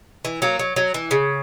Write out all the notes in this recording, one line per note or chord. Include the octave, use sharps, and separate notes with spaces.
E3
F#3 A#3
F#3
F#3
E3
C#3